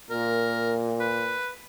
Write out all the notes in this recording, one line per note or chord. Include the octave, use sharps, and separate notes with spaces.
A#2 A#4
B4